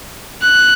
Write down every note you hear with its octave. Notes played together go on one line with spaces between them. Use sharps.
F#6